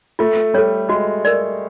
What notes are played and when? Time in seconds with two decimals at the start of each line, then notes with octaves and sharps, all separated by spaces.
0.19 A3 F4
0.54 G3 A4 C#5
0.89 G#3 F#4
1.25 A#4 D5